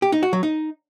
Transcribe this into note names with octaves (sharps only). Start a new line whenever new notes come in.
G4
D#4
F#4
F#3
D#4